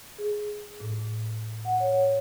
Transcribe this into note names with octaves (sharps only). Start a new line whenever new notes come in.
G#4
A2
F#5
C#5